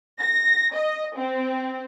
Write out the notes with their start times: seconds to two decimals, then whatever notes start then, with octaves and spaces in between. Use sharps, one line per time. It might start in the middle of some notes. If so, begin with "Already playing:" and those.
0.21 A#6
0.74 D#5
1.16 C4